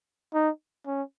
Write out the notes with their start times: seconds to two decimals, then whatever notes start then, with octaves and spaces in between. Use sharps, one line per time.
0.34 D#4
0.86 C#4